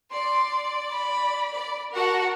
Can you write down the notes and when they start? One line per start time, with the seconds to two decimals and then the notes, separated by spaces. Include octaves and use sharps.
0.12 D5 C6
0.93 B5
1.53 D5
1.95 F#4 A#4 F#5 A5